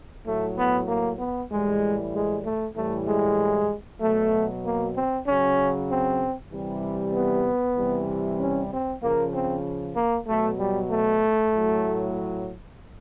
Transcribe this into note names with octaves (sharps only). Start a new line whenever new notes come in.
A2 F#3 A3
B3
A#3
B3
A2 E3 G3 G#3
G#3
A3
A2 E3 G3 A3
G#3
B2 F#3 A3
A#3
C4
C#3 F#3 C#4
C4
C3 E3 G3
B3
C3 E3 G3
C#4
C4
C#3 F3 A#3
C4
A#3
B2 F#3 A3
G3
A3
A2 F#3